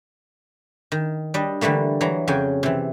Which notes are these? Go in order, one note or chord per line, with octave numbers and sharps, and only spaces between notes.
D#3
G3 D4 D#5
D3 E3 G3 A3 A#3
E3 F#3 A#5
F2 C#3 F#4 G5 G#5
C3 E3